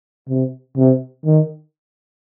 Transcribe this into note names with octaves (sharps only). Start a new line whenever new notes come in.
C3
C3
D#3